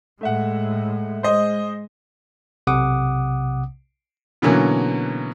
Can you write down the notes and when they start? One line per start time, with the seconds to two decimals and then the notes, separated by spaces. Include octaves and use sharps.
0.21 A2 G#3 A3 E5 F#5
1.23 G#3 C5 D#5
2.67 B1 C3 F#5 D6 D#6
4.42 B2 D3 E3 F#3 A#3 C#4